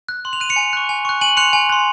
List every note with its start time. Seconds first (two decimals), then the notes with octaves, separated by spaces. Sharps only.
0.09 F#6
0.25 C6 F#7
0.33 F7
0.40 F#6 D#7
0.49 C#7 F7
0.56 G#5
0.73 C#6 F#6
0.89 G#5
1.05 C#6 F#6
1.21 G#5 D#7 F#7
1.37 C6 F#6 C#7 F7
1.53 G#5
1.69 C6 F#6